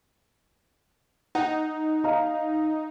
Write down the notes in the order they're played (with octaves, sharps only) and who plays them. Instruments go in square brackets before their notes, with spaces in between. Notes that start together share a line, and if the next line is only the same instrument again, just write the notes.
[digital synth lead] D#4 [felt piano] F#5
[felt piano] D#5 F5 A#5